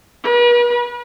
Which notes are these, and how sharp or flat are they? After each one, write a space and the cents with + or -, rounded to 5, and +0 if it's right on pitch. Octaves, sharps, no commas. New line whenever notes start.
B4 -45